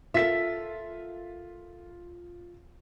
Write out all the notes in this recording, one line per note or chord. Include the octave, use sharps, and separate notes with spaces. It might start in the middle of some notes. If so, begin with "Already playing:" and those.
F4 A4 A#4 E5 B6